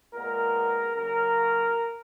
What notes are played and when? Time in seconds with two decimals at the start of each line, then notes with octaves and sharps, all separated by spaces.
0.13 A#2 G#3 B3 A#4
0.96 C#3 F#3 A#3 A#4